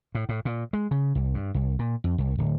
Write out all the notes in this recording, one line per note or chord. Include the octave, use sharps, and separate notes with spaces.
A2
A2
A#2
G#3
C#3
C2
G2
C2
A#2
F2
C2
D1